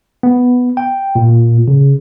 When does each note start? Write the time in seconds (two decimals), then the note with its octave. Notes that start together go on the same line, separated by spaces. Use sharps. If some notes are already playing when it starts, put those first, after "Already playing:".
0.23 B3
0.77 G5
1.15 A#2
1.68 C#3